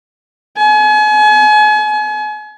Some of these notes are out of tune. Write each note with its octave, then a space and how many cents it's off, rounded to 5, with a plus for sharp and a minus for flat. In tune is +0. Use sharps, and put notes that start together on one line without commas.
G#5 +40